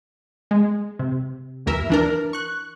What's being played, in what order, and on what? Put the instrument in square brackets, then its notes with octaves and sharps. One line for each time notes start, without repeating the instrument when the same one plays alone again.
[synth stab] G#3
C3
G1 D#2 E3 A#4 E5
E3 D4 A#4
C#6 F#6